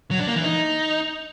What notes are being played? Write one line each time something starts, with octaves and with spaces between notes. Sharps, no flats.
F#3
D4
A#3
E3
D#4